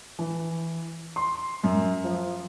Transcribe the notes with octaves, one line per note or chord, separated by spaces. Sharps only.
E3
C6
F#2
F3